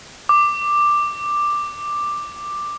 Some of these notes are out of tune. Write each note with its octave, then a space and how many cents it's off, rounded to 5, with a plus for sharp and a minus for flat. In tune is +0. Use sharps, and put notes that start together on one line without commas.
D6 +5